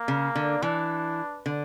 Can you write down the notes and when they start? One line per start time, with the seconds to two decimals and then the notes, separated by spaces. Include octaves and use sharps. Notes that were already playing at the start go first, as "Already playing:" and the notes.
Already playing: A#3
0.08 C#3
0.36 D3
0.62 E3 D4
1.46 D3